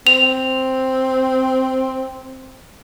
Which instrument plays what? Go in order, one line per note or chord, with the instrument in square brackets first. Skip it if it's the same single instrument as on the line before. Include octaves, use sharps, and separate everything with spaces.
[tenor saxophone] C4 [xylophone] F7